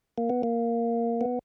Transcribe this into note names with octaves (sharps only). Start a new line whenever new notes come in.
A#3
B3
A#3
B3